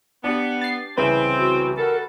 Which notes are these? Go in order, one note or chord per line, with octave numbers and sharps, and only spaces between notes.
B3 D4 G4
A6 C7
C2 C#3 E3 C4 B4
F#4
G3 F#4 A4 A#4